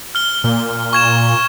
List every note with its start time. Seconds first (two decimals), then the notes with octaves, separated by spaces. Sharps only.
0.15 F6 G7
0.44 A#2
0.93 C#6 G#6 E7